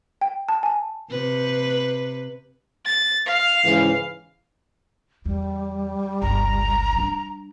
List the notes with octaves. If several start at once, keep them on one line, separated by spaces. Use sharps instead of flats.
G5
A5
G#5 A5
C3 B4
A6
F5
G#2 C#3 E3
E2 G3
G1 C#2 A#5
G3 D4